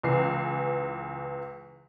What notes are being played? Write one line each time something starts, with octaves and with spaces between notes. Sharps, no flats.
C#2 E3 C7